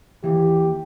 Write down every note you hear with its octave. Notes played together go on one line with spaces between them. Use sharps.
D#2 E3 G4